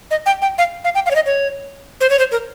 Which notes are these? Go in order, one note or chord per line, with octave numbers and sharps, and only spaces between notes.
D#5
G5
G5
F5
F5
G5
F5
C#5
D#5
C#5
C5
C#5
C5
A#4